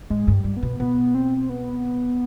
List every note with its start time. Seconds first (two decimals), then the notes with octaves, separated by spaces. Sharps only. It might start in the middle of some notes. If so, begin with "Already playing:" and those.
0.10 G#2 G#3
0.28 G2
0.33 G3
0.44 G2
0.57 B3
0.63 B2
0.80 B2 B3
1.15 C4
1.49 B3